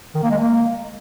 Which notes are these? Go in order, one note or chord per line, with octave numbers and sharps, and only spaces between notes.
D#3
A#3
G#3
A#3